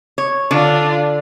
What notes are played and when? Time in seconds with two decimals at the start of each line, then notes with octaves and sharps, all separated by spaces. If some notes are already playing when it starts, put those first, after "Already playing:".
0.18 C#5
0.51 D3 D4 F4